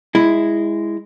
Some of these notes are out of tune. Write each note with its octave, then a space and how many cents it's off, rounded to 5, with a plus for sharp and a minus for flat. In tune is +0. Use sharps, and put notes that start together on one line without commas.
G#3 -10 E4 +0